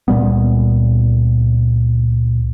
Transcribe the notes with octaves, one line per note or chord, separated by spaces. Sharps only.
C#2 A#2 G3 B3